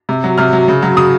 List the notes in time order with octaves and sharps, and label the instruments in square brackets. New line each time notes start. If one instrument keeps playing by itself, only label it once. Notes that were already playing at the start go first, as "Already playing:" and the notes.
[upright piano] C3
F#3
C3 F6
F#3
C#3
F#3
C#3 D#6